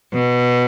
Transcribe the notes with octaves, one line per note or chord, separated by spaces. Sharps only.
B2